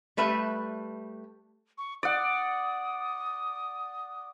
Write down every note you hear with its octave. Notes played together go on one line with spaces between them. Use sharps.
G3 A3 B4 E5
C#6
D5 F#5 D#6